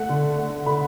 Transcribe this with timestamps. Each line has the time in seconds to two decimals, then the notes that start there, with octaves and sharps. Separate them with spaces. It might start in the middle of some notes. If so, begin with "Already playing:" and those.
Already playing: A3 F#5
0.09 D3
0.38 A3
0.66 D3 B5